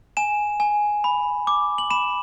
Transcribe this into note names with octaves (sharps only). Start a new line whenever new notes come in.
G#5 E7
G#5
B5
D6
F#7
B5 E7